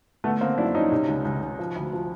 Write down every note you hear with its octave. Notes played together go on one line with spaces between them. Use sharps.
D3 A3 B3
D3 A#3 C4
F#2 D4 E4
F3 C#4 D#4
C3
C#2
C#2
C#2
F3
D2
F3